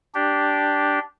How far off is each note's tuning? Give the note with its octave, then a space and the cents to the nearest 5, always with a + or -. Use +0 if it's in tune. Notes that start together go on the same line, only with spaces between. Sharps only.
D4 -5 G4 -5